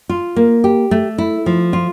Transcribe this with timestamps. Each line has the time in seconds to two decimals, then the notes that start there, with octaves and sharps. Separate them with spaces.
0.09 F4
0.36 A#3
0.64 G4
0.91 A3
1.18 E4
1.46 F3
1.73 F4